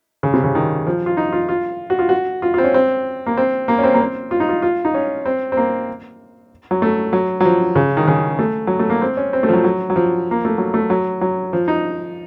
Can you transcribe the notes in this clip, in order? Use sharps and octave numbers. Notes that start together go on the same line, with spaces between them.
C#3
C3
C#3
D#3
F3
F4
D#4
F4
F4
F#4
F4
F#4
F4
C4 F4
C#4
C4
A#3
C4
A#3
C#4
C4
A#3
C4
F4
D#4
F4
F4
D#4
C#4
C4
C4
A#3
F#3
A3
F#3
F#3
F3
C#3
D#3
C#3
A3
F#3
A3
A#3
C4
C#4
C4
A3
F3
F#3
F#3
F#3
F3
A#3
A3
F#3
A3
F#3
F#3
F3
D#4